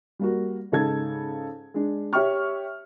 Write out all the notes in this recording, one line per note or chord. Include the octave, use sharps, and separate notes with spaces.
G3 A#3 F#4
G#2 C#3 D#4 A4 A5 G#6
G#3 D4
G4 C#5 E5 G5 C#6 F6